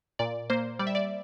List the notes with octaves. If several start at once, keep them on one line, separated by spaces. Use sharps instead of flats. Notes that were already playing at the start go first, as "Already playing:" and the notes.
A#2 D5
A#3 C5
G3 D5
E5
D5